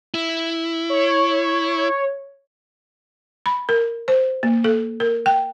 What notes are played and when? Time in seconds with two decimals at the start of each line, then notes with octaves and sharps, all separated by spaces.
0.14 E4
0.90 C#5
3.46 B5
3.69 A#4
4.08 C5
4.43 A#3
4.64 A4
5.00 A#4
5.26 G5